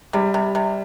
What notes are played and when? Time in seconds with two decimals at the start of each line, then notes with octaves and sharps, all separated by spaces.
0.13 C3 G3
0.34 C3
0.55 C3